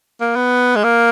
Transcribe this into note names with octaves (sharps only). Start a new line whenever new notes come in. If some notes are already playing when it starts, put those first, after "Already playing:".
A#3
B3
G#3
A#3